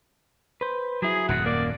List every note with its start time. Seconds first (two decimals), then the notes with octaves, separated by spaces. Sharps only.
0.61 B4 C5
1.02 F#3 E4 G#4
1.29 D#1 F#2 F#5
1.46 A#3 D5